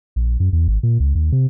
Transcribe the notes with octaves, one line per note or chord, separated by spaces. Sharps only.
A#1
F#2
E2
G#1
A#2
C#2
D#2
C3